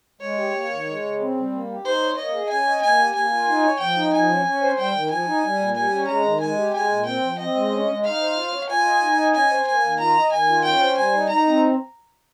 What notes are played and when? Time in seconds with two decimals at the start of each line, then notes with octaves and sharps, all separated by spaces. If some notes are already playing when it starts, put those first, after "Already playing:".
0.21 G#3 C#5
0.37 G4
0.54 A#3
0.70 D#3
0.87 G#3
1.03 C#3
1.20 C4
1.36 G3
1.51 A#3
1.68 G4
1.84 D#4 C5
2.01 C#5
2.17 A#3 D#5
2.33 G#4
2.49 C#4 G#5
2.67 D#5
2.82 A#3 G#5
2.99 G4
3.15 A#3 G#5
3.31 F4
3.48 D#4
3.64 C#5
3.80 F3 G5
3.97 D#4
4.13 F3 G#5
4.29 C#4
4.45 C#4
4.62 C5
4.78 G3 G5
4.94 D#3
5.10 F3 G#5
5.26 D#4
5.43 G3
5.59 A#2
5.75 G3 G#5
5.92 C#4
6.08 G#3 A#5
6.25 D#3
6.40 G#3 G#5
6.57 G4
6.73 G#3 G#5
6.90 A#2
7.05 C4 G5
7.23 F3
7.39 C4 D#5
7.55 G#3
7.71 C#4
7.88 G#3
8.04 D#4 F5
8.20 C5
8.36 F4
8.52 C#5
8.69 F4 G#5
8.85 D#5
9.01 D#4
9.18 D#5
9.34 C#4 G#5
9.50 C5
9.67 A#3 G#5
9.83 D#3
10.00 F4 A#5
10.15 D#5
10.31 D#3 G#5
10.49 F4
10.64 C#4 G5
10.81 C5
10.97 G3 G#5
11.13 D#4
11.29 D#4 A#5
11.46 C4